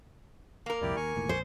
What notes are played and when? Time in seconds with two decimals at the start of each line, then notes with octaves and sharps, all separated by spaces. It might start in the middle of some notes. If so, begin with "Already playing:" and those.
0.66 A#3 A#4
0.82 C2 F2 A#2 E4 G4 D5
0.96 D#2 G#5 C#6
1.16 E1 D#2 A2
1.29 A#1 C5